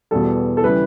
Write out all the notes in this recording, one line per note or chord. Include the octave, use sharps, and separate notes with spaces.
E2 B2 G3 A4
A4
C#3 E3 G3 B4